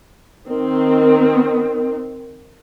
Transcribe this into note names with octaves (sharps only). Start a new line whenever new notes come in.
D#3 C4